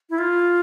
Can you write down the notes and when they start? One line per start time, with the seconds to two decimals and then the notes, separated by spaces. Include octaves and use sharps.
0.10 E4
0.18 F4